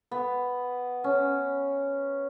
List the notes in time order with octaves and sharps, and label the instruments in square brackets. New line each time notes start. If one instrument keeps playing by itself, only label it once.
[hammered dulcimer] B3
C#4